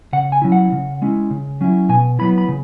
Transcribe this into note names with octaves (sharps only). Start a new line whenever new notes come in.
C#3 F#5
G#5
F#3 C#4 E4
F#5
C#3
G#3 C#4 E4
C#3
F#3 C#4 E4
B2 G#5
F#3 B3 E4 B5
B5
C#3